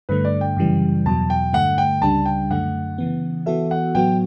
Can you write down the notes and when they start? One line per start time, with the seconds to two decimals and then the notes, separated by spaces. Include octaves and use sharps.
0.09 G2 D3 A3 B4
0.25 D5
0.41 G5
0.57 F#2 C#3 E3 G3
1.06 E2 B2 F#3 A5
1.30 G5
1.53 G2 D3 A3 F#5
1.78 G5
2.02 C#2 C#3 G3 D4 A5
2.25 G5
2.50 F#2 D3 A3 F#5
2.98 C#3 E3 B3
3.46 E3 B3 F#4 A4 E5
3.71 F#5
3.95 A2 F#3 B3 F#4 G5